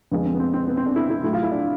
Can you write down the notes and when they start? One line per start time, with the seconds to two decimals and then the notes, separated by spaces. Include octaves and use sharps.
0.12 F2 D3 F3 G#3 B3
0.25 C4
0.34 B3
0.40 C4
0.54 C4
0.67 B3
0.77 C4
0.86 D4
0.96 E4
1.10 E4
1.24 A2 F#3 E4
1.33 F4
1.42 E4
1.52 D4